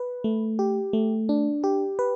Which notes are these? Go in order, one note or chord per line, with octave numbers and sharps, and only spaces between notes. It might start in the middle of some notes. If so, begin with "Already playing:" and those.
Already playing: B4
A3
G4
A3
D4
G4
B4